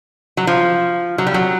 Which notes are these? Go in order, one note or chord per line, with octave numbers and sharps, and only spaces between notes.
F#3
F3
F#3
G3
F#3